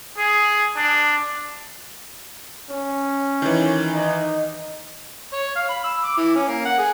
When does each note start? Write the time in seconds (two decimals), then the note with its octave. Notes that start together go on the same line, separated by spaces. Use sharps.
0.18 G#4
0.76 D4
2.70 C#4
3.42 D#3 E3
3.93 D#4
5.33 C#5
5.56 F5
5.69 B5
5.84 E6
6.04 D6
6.17 E3
6.35 C#4
6.48 A#3
6.65 F#5
6.78 G#4